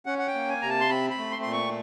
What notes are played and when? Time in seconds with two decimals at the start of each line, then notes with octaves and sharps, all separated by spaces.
0.06 C#4 F#5
0.18 F#5
0.28 G5
0.34 A#3
0.48 G#5
0.62 C3 A#5
0.69 A5
0.81 C6
0.89 C4 B5
1.10 B5
1.18 A3
1.31 C6
1.42 A#2 C6
1.52 C#6